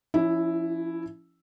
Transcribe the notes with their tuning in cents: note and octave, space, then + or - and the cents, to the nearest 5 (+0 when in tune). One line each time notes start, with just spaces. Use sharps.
F3 -35 C#4 +20 E4 +0